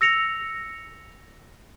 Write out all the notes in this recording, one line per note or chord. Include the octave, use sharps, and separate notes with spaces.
E6 A#6 C#7 F7